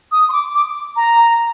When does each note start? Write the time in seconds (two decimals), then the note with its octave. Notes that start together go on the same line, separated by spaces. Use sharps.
0.12 D#6
0.29 C6
0.33 D6
0.55 D6
0.96 A#5